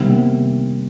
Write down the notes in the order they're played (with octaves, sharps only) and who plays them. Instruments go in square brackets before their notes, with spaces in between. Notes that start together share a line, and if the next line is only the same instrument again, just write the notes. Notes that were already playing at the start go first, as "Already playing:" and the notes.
Already playing: [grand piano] C3 D#3 G3 A#3 [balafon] B3